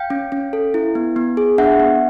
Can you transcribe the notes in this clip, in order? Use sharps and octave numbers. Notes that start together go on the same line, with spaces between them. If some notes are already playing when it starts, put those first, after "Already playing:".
Already playing: F5 G5
C#4
C#4
A4
E4
B3
B3
G#4
D4 E5 F#5
B3